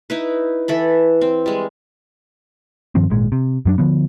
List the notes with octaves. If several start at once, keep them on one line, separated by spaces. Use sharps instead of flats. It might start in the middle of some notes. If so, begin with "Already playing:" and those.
D#4 E4 B4
E3 A4 B5
C4
G3 G#3
G2 D#3 F3 C4
G#1 A#2 G#3
C3
F#2 F#3 D4
D3 F3 B3